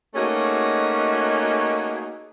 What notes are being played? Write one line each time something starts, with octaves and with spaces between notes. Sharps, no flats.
A3 A#3 C#4 D#4 F#4 G#4